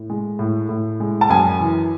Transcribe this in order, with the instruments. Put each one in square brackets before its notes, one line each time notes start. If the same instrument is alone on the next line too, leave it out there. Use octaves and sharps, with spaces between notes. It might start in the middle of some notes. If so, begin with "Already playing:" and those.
Already playing: [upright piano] A2
G#3
A2
A2
G#3
A5
F#2 G#5
E3